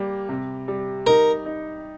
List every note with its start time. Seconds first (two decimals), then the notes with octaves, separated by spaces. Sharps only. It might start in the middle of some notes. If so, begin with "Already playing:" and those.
Already playing: G3 A#3
0.29 C3
0.68 G3
1.07 D#4 A#4
1.46 D#4